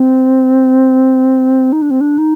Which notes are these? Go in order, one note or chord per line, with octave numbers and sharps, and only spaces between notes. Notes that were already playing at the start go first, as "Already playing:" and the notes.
Already playing: C4
D#4
D4
C4
D4
D#4